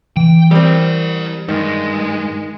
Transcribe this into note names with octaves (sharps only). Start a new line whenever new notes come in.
E3 G5
G3 C4 E4 A#4
G2 D#3 G#3